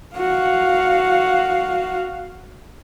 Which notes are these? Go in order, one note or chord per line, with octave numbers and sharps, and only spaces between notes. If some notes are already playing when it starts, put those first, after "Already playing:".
F#4 F5